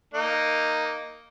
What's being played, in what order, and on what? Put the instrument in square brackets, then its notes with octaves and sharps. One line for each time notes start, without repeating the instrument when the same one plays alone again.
[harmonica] A#3 D#4